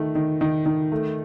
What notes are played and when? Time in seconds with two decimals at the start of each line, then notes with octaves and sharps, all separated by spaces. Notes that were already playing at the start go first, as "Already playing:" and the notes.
Already playing: D#3 A3
0.15 D#3
0.41 D#3
0.66 D#3
0.92 A3